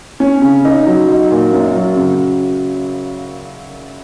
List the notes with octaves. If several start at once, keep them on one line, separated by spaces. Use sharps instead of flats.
C#4
C#3
D#4
F#3
D#4
A#2
F#2
F#3
C#3